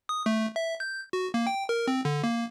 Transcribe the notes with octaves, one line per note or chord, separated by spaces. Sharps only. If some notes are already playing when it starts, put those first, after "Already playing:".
D#6
A3
E5
G6
F#4
A#3
G5
A#4
C4
D3
A#3